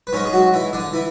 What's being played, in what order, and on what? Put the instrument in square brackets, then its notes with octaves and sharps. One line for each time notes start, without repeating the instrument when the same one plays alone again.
[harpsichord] B4
G#2 G#3 C#4 C#5
G#4
F#3 F#4
E3 E4
D3 D4
E3 E4